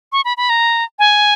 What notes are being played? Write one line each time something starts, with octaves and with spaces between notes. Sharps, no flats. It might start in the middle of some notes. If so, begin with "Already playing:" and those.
C#6
B5
B5
A#5
G#5